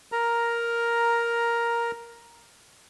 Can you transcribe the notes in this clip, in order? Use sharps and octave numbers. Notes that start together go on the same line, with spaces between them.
A#4 A#5